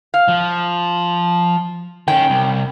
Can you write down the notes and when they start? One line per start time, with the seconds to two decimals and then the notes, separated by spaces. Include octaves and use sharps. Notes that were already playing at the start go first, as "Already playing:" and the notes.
0.14 F5
0.28 F3
2.08 D#3 C#4 G5
2.30 C2